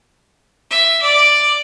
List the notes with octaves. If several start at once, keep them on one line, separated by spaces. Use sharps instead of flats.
E5
D5